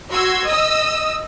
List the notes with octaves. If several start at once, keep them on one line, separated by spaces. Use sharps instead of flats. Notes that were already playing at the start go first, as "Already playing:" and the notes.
F#4 C6 E6 G#6
D#5 D#6 E6